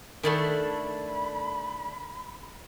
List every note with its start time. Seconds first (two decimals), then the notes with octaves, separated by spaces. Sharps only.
0.23 D#3 A3 D4 E4 A4 B5